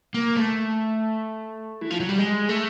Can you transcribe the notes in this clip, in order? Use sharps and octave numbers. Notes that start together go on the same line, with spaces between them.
A#3
A3
E3
F3
F#3
G3
G#3
A3